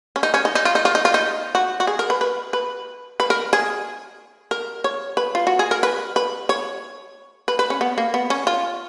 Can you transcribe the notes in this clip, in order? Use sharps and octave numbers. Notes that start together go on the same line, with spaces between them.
C#4
D#4
C#4
D#4
D#4
F4
D#4
F4
D#4
F4
D#4
F#4
F#4
G#4
A#4
B4
B4
B4
B4
A#4
G#4
A#4
C#5
B4
F4
F#4
G#4
A#4
B4
B4
C#5
B4
B4
C#4
B3
A#3
B3
C#4
F4